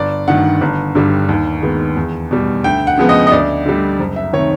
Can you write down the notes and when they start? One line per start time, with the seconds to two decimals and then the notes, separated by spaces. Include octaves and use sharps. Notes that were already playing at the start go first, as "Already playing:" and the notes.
Already playing: G1 D5
0.28 G2 D#3 F#5
0.61 G1
0.95 G2 D3 G3
1.29 D#2
1.62 D#3 G#3 B3
1.96 E2
2.31 B2 G3
2.64 D2 G5
2.87 F#5
2.98 C#3 F3 G#3 B3
3.09 D#5
3.27 D#5
3.32 D2 D5
3.66 D3 G3
3.99 F#1
4.16 E5
4.33 C3 D#3 C#5